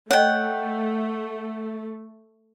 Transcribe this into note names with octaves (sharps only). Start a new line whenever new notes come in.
A3 C#5 D#5 F#5 G5